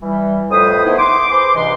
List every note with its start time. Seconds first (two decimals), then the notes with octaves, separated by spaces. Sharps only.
0.02 E3 G3
0.50 F2 A2 B4 C5 D#6
0.84 D#3 A3 B3 D#4 E4 C5
0.98 C6 D6
1.30 G#4 B4 C5 C6 D6
1.55 C#2 G2 C3 E3 D#5 C6